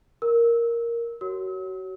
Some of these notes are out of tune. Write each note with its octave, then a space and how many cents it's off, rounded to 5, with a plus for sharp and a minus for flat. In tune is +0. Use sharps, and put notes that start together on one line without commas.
A#4 +0 E6 -15
F#4 +30 C#5 +0 E6 -45